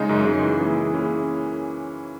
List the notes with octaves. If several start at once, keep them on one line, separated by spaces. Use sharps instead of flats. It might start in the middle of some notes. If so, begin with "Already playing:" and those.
Already playing: C#3 G#3 D#4
F#2
C#3 G#3 D#4
E3
A#3 C#4 E4 G#4
E3
A#3 C#4 E4 G#4